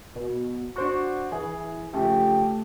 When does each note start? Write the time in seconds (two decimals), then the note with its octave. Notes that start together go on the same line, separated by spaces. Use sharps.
0.15 B2
0.76 D4 F#4 C5 C#6
1.32 E3 G#4
1.94 C#3 F3 A3 G4